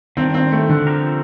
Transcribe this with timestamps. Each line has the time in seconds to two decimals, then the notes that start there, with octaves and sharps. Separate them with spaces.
0.17 D#3 G3 C4 D4
0.34 C4
0.52 A3
0.69 D3
0.87 F3 C4 G4 A#4